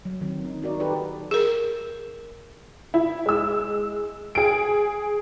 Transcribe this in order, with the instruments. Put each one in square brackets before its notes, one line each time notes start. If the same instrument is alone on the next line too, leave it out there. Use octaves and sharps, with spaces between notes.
[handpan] F#3
D#3 F#3 C4
D#4
D#4 F#4 A#4 D5
D#4 G4 A4 B4 D5
[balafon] G#4 A#4
[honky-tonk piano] E4
G#3 E6
G#4 D7